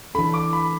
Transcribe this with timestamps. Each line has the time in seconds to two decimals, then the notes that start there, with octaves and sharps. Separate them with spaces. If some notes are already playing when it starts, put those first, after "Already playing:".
0.15 E3 D4 A4 B5
0.34 D6
0.53 B5